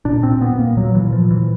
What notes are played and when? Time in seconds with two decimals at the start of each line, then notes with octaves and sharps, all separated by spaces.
0.05 A#2 D4
0.23 C4
0.29 A#2
0.41 B3
0.53 A#2
0.59 A#3
0.77 A#2 F#3
0.95 E3
1.01 A#2
1.12 F3
1.25 A#2
1.31 E3